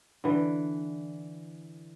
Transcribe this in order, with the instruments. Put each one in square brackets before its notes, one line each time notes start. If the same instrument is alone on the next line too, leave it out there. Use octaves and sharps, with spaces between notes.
[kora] D3 E3